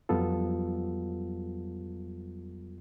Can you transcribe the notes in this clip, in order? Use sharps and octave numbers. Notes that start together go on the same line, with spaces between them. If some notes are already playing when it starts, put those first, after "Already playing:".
F2 F#3 G3 B3 F4 A4